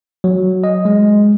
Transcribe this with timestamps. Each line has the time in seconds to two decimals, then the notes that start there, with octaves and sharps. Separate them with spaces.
0.24 F#3
0.64 D#5
0.85 G#3